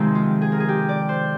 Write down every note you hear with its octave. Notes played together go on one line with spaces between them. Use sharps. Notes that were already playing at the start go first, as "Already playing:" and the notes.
Already playing: F2 C3 D#3 G#3 C4 D#4
F4
G#4
A#4
G#4
G4
D5
C5